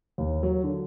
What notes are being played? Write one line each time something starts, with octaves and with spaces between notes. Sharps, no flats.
D#2
F#3
D3